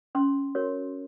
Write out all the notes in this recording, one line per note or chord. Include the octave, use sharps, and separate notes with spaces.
C#4 C6
F#4 A#4 C#5